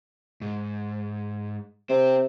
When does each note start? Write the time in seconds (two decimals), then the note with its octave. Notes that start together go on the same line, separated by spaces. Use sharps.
0.42 G#2
1.90 C3 C4